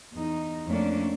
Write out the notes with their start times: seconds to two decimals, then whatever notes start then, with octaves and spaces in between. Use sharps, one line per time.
0.13 E2 D#4
0.68 F2 A3 A#3 C#4 D4